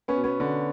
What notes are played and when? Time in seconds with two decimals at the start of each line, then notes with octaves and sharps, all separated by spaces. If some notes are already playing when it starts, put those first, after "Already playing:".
0.08 B3 C#4
0.16 B2
0.24 B3 C#4
0.40 D3